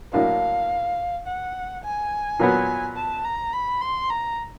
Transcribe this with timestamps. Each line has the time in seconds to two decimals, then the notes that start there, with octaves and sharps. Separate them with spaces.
0.13 A2 F#3 A#3 D4 F5
1.27 F#5
1.84 G#5
2.39 A#2 F#3 B3
2.96 A5
3.25 A#5
3.53 B5
3.81 C6
4.10 A#5